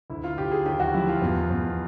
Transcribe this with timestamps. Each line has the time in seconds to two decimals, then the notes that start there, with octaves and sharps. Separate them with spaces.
0.10 D2 E4
0.24 F4
0.37 D2 G4
0.52 G#4
0.65 D#2 G4
0.80 F#4
0.94 F3 E4
1.08 F4
1.22 E2
1.50 E2